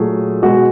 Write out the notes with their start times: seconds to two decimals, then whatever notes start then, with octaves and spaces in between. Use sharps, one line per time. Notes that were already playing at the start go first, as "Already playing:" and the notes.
Already playing: A#2 F#3 A3 G#4
0.42 B2 G#3 F#4